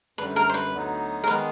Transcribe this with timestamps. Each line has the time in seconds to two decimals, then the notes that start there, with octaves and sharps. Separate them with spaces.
0.18 F#2 D3 G3 B4
0.36 A#4
0.50 C5
0.54 B4
0.73 D2 D3 F#3 B3 D#4
1.24 A#4
1.28 D#3 G#3 B3 B4